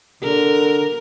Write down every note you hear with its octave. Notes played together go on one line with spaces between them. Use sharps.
D3 A#4